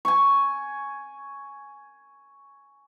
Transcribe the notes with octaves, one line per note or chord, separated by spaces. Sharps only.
G#5 C#6